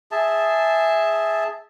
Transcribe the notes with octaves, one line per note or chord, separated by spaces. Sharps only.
G#4 E5 A5